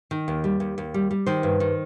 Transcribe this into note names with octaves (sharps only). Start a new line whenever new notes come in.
D#3
D#2
G3
D#2
D#2
G3
G3
D#3 C5
G2
D#3